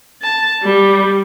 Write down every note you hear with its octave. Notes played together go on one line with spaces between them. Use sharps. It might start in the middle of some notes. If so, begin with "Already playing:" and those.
A5
G3